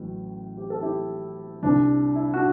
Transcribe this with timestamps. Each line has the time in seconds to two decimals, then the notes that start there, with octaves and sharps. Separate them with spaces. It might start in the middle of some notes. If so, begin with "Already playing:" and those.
Already playing: A1 A2 F#3
0.57 G4
0.70 A4
0.82 E4 G4
1.62 C2 C3 G3 D4
2.16 E4
2.34 D4 F#4